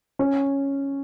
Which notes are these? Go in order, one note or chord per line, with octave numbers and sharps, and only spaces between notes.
C#4